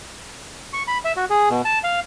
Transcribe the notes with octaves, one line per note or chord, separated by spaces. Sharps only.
C#6
B5
E5
F#4
G#4
B2
A5
F5